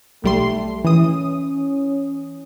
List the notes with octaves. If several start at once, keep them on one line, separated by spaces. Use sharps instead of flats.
B1 G3 A3 C6
E3 C#4 D#6